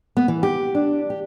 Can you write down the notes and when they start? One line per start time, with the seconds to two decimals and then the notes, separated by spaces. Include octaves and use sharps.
0.17 B3
0.28 E3
0.43 G4
0.75 D4
1.10 G4